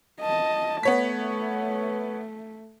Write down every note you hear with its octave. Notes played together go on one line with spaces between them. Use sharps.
D#5 A5
A3 B3 C#5 B6